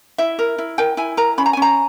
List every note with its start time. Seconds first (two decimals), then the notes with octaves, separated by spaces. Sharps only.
0.18 E4 E5
0.39 A#4
0.58 E4
0.78 A#4 G5
0.97 E4 G#5
1.17 A#4 A#5
1.38 C#4 B5
1.46 A#5
1.53 G#5
1.57 C#4 A#5